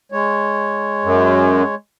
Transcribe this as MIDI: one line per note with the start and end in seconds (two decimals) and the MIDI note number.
0.12 1.75 56
0.12 1.75 73
1.04 1.63 42